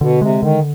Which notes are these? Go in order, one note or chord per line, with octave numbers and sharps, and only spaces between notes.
B2 D3
C3 G#3
D3 D#3